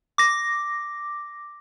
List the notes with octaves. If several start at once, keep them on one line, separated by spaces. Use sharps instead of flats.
D6 A#6